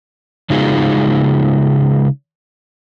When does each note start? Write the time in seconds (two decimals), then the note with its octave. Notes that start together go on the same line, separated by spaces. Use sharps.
0.50 C#3 G#3 D#4 F4 F#4 G#4